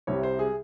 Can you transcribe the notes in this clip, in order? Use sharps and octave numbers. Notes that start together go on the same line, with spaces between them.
C2 C3 G3 C#5
C5
G#4